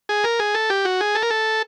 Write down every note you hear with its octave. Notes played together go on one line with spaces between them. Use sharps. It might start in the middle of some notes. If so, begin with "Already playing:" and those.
G#4
A#4
G#4
A4
G4
F#4
G#4
A4
A#4
A4